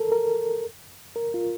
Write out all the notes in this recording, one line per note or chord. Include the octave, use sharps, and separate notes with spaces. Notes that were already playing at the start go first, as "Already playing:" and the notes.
Already playing: A4 A#4
A#4
A#4
F4